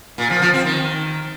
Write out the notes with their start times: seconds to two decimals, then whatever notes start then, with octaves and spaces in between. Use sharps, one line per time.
0.18 A#2
0.30 F3
0.42 F3
0.54 C4
0.65 D#3